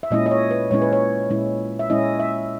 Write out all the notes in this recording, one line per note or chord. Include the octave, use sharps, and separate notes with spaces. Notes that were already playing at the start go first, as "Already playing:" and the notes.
E5
A#2 G#3 C#4 E4 D#5
D#5
C#5
B4
A#2 G#3 C#4 E4 C#5
B4
C#5
A#2 G#3 C#4 E4
E5
A#2 G#3 C#4 E4 D#5
E5